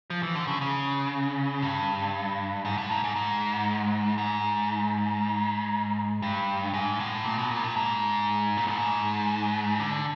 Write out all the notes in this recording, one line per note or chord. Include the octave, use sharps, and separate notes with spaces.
F3
E3
D3
C#3
C#3
G2
G#2
A2
G#2
G#2
G#2
G#2
G2
G#2
A2
A#2
B2
A#2
A2
G#2
A#2
A2
G#2
D3